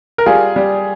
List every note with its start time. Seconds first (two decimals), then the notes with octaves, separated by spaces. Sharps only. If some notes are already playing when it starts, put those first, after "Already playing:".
0.18 A#4
0.26 G3 F4 G#4
0.56 G3